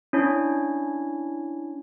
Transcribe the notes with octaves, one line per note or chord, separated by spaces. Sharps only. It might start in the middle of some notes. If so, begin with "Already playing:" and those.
C#4 D4 E4 C#5